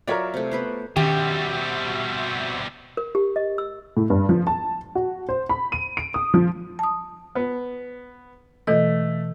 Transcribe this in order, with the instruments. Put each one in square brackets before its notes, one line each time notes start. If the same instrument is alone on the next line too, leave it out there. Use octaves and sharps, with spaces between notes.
[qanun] F#3 F4 E5 [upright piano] A#4 C#5 D5
[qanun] C3 A3
B3 B4 C5
[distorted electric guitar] B2 G3 [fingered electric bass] D#3 C#4 [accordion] C4 F#4 E5 [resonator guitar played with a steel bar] G4
[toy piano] A#4
G4
D#5
E6
[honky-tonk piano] A2
G2
F3
A5
F#4
C5
B5
D#7
D7
D#6
F3
[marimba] A5 D#6
[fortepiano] B3
[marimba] B2 E3 D#5 [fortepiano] A3